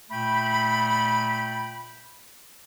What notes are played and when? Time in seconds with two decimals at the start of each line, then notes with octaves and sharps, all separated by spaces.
0.10 A#2 A3 G5 B5